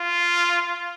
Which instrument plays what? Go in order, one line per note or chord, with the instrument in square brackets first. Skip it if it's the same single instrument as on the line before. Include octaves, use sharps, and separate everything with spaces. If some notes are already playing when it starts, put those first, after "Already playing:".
Already playing: [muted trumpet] F4